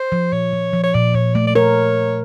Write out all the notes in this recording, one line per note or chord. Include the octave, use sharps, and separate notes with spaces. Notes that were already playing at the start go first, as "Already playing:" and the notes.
Already playing: C5
F3
A#2 C#5
F3
F3
C#5
A#2 D5
A#2 C#5
A3 D5
D5
A#4 C#5